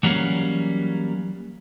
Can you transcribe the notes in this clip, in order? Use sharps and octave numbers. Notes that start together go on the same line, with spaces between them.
E3 F#3 G3 A#3 C#4